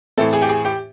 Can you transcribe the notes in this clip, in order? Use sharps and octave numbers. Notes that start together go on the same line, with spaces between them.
A2 E3 A3 C4 A4
G#4
G4
G#4
G4